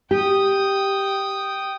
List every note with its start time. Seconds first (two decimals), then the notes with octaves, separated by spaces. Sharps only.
0.11 G4 G5 D#6